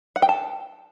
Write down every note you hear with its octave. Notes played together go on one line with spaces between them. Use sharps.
F#5
G5
A5